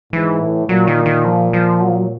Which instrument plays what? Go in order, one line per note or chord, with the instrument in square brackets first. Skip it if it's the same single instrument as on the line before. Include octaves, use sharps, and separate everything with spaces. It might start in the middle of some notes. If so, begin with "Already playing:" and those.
[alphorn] G#2 [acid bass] E3
[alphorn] A2
[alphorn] A#2 [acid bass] F#3
[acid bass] D#3
D#3
F3
F3
F#3
F3
F#3